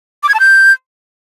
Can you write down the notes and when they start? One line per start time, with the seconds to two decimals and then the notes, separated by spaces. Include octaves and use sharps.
0.23 D6
0.29 G#6
0.34 A5
0.40 G6